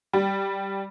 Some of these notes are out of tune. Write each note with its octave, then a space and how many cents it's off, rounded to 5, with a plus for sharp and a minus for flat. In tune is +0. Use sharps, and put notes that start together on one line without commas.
G3 -5